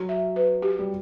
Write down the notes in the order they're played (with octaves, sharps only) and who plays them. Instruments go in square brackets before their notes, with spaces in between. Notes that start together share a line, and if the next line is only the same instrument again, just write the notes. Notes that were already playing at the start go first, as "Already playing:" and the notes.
Already playing: [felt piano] F#3
[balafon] E5
B4
G4
[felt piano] G3